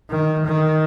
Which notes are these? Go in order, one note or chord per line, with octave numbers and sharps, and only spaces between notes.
D#3
D#3